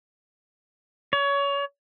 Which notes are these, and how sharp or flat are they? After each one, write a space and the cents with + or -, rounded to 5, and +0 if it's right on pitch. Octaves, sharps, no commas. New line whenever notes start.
C#5 +25